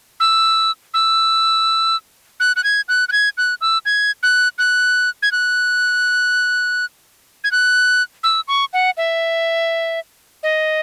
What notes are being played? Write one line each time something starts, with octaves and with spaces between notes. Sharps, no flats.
E6
E6
F#6
F#6
G#6
F#6
F#6
G#6
F#6
E6
G#6
F#6
F#6
G#6
F#6
G#6
F#6
E6
C#6
F#5
E5
D#5